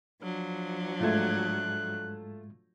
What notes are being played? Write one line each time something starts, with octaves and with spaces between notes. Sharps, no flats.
F3 F#3 D4
G#2 G#3 A3 F4 F#6 G#6